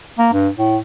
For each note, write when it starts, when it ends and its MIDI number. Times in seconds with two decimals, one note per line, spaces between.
0.19 0.29 58
0.33 0.48 43
0.58 0.77 45